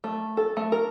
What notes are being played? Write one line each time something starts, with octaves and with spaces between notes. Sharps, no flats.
A3
A4
A3
A#4